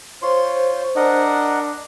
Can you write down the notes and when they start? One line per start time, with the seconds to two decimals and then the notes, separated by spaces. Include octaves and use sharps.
0.22 F4 C5 C#5 C6
0.96 D4 A#4 D#5 F#5